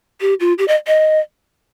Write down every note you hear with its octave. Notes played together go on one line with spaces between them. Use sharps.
G4
F4
G4
D#5
D#5